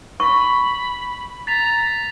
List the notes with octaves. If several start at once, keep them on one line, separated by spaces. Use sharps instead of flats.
B5 C#6
A#5 A6 B6 F7